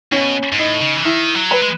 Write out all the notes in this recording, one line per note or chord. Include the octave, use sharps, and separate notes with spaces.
B2 C#4
G#2
A2 D#4
C#3
E3
D#3 E4
F#3
B4
G#3